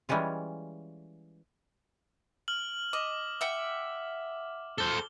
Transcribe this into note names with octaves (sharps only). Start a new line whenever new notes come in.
E3 G3 G#3 C#4 F4
F6 F#7
D#5 D6
E5 F#5 G5
A4 C5 G7